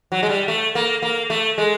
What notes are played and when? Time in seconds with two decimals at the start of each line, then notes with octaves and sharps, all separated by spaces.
0.12 F#3
0.23 G#3
0.29 G3
0.48 A3
0.75 A#3
1.02 A#3
1.30 A3
1.58 G#3